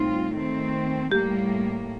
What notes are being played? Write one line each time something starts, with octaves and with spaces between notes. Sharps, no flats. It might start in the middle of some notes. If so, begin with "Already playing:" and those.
Already playing: A2 G3 C4 D#4 F4
D#3 A3 C4
A2 G3 A#3 G4